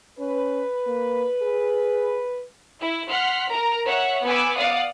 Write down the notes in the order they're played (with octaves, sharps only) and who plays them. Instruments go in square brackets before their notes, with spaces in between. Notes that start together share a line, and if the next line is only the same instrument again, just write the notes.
[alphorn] C#4 [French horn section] B4
[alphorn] A#3
G#4
[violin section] E4
F#5 C6 F6 B6
A#4 A#5
C#5 E5 F#5
B3 B4 G#5 D6 E6
D5 F5 F#5 D#6